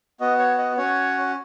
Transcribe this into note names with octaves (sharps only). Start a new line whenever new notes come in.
B3 F#4 D#5
C#5
D#5
C#4 F#4 C#5